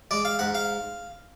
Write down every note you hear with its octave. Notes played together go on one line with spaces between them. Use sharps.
G#3 D5
F5
G#2 F#5
F5